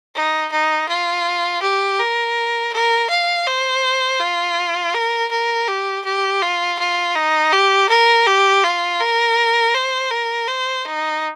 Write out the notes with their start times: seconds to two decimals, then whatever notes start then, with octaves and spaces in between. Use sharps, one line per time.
0.15 D#4
0.52 D#4
0.89 F4
1.62 G4
2.00 A#4
2.73 A#4
3.10 F5
3.47 C5
4.20 F4
4.94 A#4
5.32 A#4
5.68 G4
6.05 G4
6.42 F4
6.79 F4
7.16 D#4
7.53 G4
7.90 A#4
8.27 G4
8.64 F4
9.00 A#4
9.75 C5
10.11 A#4
10.48 C5
10.85 D#4